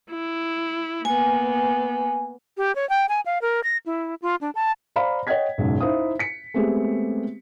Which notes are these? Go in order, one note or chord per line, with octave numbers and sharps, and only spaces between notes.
E4
A#3 B3 G#5
G4
C#5
G5
G#5
F5
A#4
A#6
E4
F4
D4
A5
C5 D5 F5 A#5 B5
C#5 D#5 F#5 G5 G#6 B6
F#1 B1 G#2
D#4 E4 C5 F5 D#6
B6 C#7
G#3 A3 B3 C4 G4 G#4